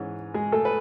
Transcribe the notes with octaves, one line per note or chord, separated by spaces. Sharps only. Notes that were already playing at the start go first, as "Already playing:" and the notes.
Already playing: G#2 E3 G#3 C#4
G#3 G#4
A3 A4
B4